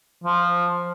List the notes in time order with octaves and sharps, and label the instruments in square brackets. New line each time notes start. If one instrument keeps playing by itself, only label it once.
[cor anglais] F3